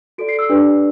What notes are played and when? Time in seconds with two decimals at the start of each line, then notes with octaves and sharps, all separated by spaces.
0.18 F#4 A4 D5 D7
0.29 C7
0.39 E6
0.49 D4 G4 B4 D5